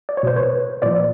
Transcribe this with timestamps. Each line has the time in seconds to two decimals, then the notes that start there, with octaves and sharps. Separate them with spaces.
0.09 D5
0.17 C#5
0.23 B2 C5
0.36 B4 C#5
0.82 A#2 F3 C5 D5